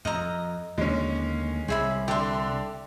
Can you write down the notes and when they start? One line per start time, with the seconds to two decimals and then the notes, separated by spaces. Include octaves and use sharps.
0.05 F2 D#5 A#5
0.78 D#2 D3 G#3 C#4
1.68 C2 G#4 E5 B5
2.08 D3 G4 E5 C6